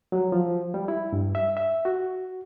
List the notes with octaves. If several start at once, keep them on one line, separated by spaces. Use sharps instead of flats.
F#3
F3
G3
E4
G2
E5
E5
F#4